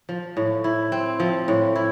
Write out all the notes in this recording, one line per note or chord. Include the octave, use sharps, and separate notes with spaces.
F3
A2
E4
C4
F3
A2
E4